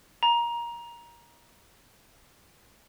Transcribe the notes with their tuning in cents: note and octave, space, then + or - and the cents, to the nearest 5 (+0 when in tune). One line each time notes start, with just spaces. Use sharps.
A#5 +20